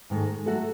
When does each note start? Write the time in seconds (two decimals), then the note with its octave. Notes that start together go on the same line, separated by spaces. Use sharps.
0.10 G#2 D#3 A3
0.46 F#3 A3 F#4 A4